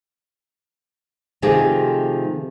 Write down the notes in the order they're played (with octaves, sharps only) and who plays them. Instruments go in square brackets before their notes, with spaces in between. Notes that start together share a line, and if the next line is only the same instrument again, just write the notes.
[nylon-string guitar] C3 D#3 F3 A3 G4 G#4